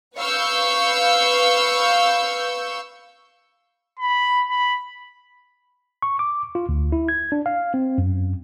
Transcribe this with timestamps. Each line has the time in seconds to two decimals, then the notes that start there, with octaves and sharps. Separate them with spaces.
0.18 B4 F5 C#6 E6 G6
3.99 B5
4.50 B5
6.02 C#6
6.19 D6
6.55 F4
6.69 D2
6.92 E4
7.09 G#6
7.32 D4
7.46 F5
7.74 C4
7.98 F#2